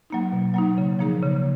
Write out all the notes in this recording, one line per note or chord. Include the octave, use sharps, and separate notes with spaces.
F#3 A#3 D#4
B2
F#3 A#3 D#4
C#3
F3 A#3 D#4 G#4
C#3